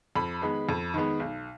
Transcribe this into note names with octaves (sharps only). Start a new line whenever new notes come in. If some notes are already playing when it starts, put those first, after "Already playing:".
F2 B5
D#3 G#3 B3
F2
D#3 G#3 B3
B1